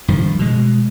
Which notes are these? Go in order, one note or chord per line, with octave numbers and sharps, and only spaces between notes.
G2 D#3 F3
B2 G#3